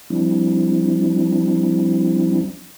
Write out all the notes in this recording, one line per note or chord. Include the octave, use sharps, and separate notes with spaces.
F3 G3 C4 D4 E4